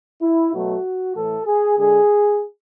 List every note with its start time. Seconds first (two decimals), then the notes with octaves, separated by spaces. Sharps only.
0.22 E4
0.53 B2 F#3 A3 F#4
1.16 A2 E3 A3 A4
1.46 G#4
1.77 D3 G#3 G#4